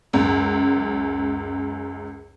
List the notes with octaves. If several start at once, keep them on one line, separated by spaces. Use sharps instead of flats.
C#2 F#2